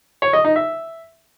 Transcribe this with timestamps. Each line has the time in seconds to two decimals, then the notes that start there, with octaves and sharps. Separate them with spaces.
0.22 C#5
0.33 D#5
0.45 D#4
0.56 E5